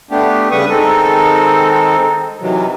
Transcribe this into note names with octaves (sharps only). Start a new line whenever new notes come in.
A3 B3 D4 G4
C#3 G3 B4 C#6 D#6
D#3 G#3 C4 D#4 A4
C3 D#3 E3 F#3